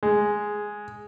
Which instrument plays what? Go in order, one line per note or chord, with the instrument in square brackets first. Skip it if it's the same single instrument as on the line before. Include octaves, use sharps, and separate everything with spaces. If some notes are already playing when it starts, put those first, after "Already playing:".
[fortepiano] G#3